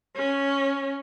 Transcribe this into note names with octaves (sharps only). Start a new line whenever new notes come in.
C#4